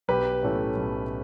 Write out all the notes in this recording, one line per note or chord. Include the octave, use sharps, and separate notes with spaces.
B1 G4 B4
A2 E3 A3 C#4
B1